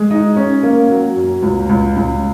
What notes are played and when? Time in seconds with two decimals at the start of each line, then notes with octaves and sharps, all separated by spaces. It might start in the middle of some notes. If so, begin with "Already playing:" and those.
Already playing: G#3
0.10 D#4
0.36 C#4
0.63 A#3
0.89 F#3
1.16 F#2
1.42 C#2
1.69 C#2
1.96 C#2